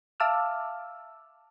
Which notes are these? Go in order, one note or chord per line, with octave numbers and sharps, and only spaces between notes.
E5 F5 A5 D6 E6 F6